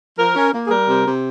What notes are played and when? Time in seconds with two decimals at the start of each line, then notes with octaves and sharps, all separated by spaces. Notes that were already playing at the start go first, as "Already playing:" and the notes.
0.18 F3 A#4
0.36 C#4
0.53 A#3
0.66 G#4
0.70 G3 A#4
0.87 C3
1.05 C3